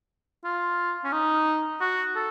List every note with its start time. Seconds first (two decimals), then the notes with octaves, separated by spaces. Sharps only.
0.44 F4
1.04 C#4
1.12 D#4
1.81 F#4
2.16 A4